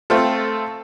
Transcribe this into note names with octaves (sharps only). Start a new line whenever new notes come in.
A3 C4 F4 A4